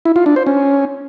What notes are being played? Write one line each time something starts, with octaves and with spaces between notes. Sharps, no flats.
E4
F4
D4
C5
C#4